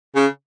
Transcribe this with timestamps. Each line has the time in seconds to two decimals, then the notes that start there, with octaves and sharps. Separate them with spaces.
0.15 C#3